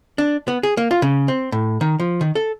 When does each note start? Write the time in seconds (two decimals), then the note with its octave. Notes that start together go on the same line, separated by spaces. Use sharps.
0.18 D4
0.48 B3
0.63 G#4
0.77 A#3
0.91 F4
1.02 C#3
1.28 C4
1.52 A2
1.81 D#3
2.00 F3
2.21 D#3
2.35 A4